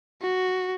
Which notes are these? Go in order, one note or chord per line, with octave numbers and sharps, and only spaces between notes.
F#4